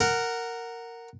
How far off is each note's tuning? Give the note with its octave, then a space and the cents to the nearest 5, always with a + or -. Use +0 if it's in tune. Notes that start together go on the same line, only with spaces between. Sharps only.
A#4 -10 F#5 +0